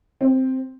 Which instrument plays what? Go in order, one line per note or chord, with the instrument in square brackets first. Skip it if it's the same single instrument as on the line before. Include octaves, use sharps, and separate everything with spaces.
[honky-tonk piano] C4